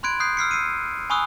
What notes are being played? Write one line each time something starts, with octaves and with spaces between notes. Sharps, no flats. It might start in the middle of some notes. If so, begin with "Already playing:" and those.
B5 C6 F#6 G#6 D7
D#6 F#6 G6 C7
E6 F6 C7 C#7
E6 C7 C#7 D#7
G#5 B5 C#6 D#6 E6 F#6